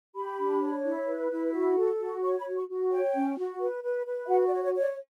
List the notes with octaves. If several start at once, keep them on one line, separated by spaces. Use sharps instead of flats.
G4 B5
D4
C#5
E4
B4
E4
F#4
A4
F#4
C#5 C#6
B5
F#4
C#6
F#4
C#5 G5
C#4
F#4
B4
B4
B4
E5
F#4 F#5
D5
C#5
C#5
C#5
D5